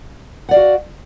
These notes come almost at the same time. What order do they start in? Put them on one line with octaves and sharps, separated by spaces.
F#5 D5 F5 F#4